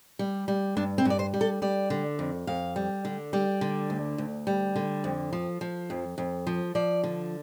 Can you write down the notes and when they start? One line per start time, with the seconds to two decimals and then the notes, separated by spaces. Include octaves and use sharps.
0.19 G3
0.48 G3
0.77 G2 D4
0.98 C4
1.05 G2 D5
1.19 C5
1.34 G3
1.41 A4
1.62 G3 D5
1.90 D3
2.19 F2
2.47 F2 F5
2.76 G3
3.05 D3
3.33 G3 D5
3.61 D3
3.90 D2
4.18 D2
4.47 G3
4.76 D3
5.04 F2
5.33 F3
5.61 F3
5.90 F2
6.18 F2
6.47 F3
6.75 F3 D5
7.04 D3